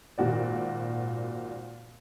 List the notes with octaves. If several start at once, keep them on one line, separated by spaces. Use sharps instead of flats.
G#1 A#2 F#4 D5